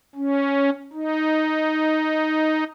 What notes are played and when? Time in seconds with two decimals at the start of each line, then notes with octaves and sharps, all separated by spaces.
0.16 C#4
0.93 D#4